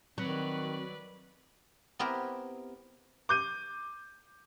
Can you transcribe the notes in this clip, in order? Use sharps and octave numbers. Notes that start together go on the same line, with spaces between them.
D#3 F#3 C4 B4 D5
B3 C4 E4 G4 A#4 B4
D6 G6 D#7